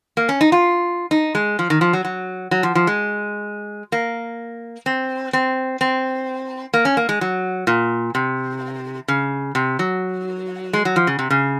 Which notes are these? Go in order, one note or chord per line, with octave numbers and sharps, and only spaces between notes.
A#3
C#4
D#4
F4
D#4
G#3
F3
D#3
F3
F#3
F#3
F#3
F3
F3
G#3
A#3
C4
C4
C4
A#3
C#4
A#3
G#3
F#3
A#2
C3
C#3
C3
F#3
G#3
F#3
F3
C#3
C3
C#3